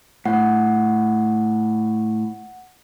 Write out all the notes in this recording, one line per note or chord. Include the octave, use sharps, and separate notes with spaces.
A2 F#5